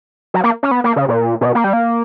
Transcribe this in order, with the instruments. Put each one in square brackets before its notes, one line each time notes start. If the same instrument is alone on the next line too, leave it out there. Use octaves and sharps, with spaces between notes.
[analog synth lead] F#3
A#3
C#4
B3
A#3
C#3
A#2
A#2
B2
A#3
G3
A#3